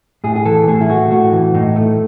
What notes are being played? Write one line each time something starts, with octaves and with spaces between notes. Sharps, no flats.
A2 G#4
G#4
E3 A4
A2 G#4
E4
A3 F#4
A2 F#4
E3
A2 D#4
A3